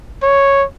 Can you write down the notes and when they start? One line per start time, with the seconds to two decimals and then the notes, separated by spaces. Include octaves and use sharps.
0.23 C#5